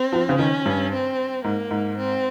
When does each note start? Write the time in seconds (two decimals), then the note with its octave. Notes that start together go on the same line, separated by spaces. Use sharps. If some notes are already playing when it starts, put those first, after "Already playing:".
Already playing: C4
0.12 F3
0.29 C#3
0.39 D#3 C#4
0.66 G2
0.92 C4
1.44 G#2 A#3
1.71 G#2
1.98 C4